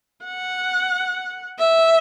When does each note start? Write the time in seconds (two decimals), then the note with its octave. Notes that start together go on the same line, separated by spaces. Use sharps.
0.24 F#5
1.59 E5